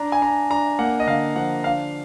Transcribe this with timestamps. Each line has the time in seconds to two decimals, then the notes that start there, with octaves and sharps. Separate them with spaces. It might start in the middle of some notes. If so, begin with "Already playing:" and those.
Already playing: D4 A#5
0.12 G#5
0.22 D4 A#5
0.50 D4 A#5
0.79 A#3 F#5
1.00 D#5
1.07 D3 F5
1.36 F3 F#5
1.64 D4 F5